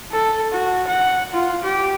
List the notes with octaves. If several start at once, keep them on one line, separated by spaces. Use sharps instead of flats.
A4
F#4
F#5
F4
G4